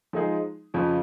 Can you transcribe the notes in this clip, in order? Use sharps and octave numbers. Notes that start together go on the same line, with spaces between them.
F3 G#3 D#4 G#4
F2 C#3 F3 C#4